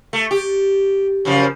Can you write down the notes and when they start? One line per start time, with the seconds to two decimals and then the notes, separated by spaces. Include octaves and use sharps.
0.13 A3
0.31 G4
1.25 F#2 C#3 F3